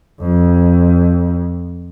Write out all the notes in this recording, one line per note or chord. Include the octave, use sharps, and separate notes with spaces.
F2